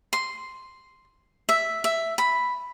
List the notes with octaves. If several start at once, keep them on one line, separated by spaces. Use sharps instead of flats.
C6
E5
E5
B5